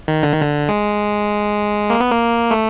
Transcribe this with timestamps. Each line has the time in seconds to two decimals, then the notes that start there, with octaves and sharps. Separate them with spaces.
0.08 D#3
0.23 D3
0.32 D#3
0.42 D3
0.69 G#3
1.90 A#3
2.00 B3
2.11 A#3
2.51 A3